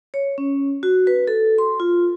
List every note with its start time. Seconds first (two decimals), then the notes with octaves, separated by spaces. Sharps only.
0.14 C#5
0.38 C#4
0.83 F#4
1.07 B4
1.27 A4
1.58 C6
1.80 F4